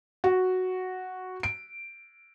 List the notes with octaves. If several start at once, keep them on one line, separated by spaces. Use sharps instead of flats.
F#4
D7